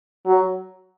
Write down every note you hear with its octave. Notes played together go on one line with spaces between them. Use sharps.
F#3